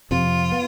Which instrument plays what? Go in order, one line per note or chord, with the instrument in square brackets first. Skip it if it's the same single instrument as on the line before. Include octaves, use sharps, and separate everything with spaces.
[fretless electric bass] F2 C3 F3 [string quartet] F4
[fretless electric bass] B3